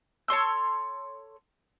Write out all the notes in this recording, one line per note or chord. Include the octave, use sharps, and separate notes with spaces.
A4 C#5 C6 E6